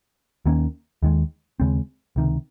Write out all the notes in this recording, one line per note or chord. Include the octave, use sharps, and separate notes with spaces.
D#2 D#3 A#3 C#4
D#2 D#3 G#3
D#2 C#3 G#3 C4
C#2 C3 D#3